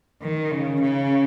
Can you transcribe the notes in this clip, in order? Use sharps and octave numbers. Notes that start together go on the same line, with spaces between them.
D#3
C#3
C#3